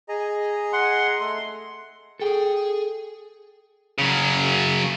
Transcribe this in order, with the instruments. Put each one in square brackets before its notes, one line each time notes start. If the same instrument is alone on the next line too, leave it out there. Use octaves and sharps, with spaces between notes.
[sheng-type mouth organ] G#4 D#5 A#5
[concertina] F#5 C6
[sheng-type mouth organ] A3 A4 [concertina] C6
[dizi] G#4 [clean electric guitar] A4 G5
[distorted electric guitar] C#3 F#3